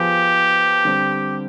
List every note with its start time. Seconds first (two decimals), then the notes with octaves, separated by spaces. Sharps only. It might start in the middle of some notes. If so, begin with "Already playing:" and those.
Already playing: F3 B3 F4 G4 G#4
0.85 D3 G3 C4